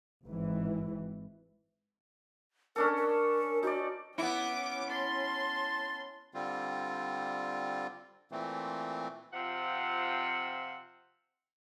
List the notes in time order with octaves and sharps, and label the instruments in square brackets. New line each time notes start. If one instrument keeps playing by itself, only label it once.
[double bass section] G#1 E3
[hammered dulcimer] C#4 D4 A4 [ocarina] A#4
[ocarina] A#4
[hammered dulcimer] D#4 D5 [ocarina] F#4
[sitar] B3 E4 [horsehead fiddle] C#4 [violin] D6
[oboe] A5 [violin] C6
[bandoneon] D3 G3 C4 F4
A#2 E3 A3 C4
[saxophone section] C3 F3 C4 F4 F#5